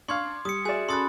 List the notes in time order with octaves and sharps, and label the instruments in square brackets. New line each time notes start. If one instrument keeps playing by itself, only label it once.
[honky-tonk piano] D4 [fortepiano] F5 C#6 [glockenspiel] C6 G#6
[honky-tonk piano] G3 [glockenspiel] D#6 C#7
[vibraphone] F#4 E5 [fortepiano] G#4 D5 [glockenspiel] G#5
[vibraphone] C#4 F#4 B5 [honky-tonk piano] A4 F#6 [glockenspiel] C6 D#6 A6